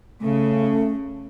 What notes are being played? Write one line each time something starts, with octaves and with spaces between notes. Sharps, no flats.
C#3 A3